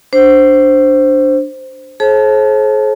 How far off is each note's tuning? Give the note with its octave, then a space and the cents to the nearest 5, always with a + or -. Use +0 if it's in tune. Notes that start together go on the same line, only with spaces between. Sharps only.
D4 +0 C5 +0
G#4 +45 C5 +40 A5 -10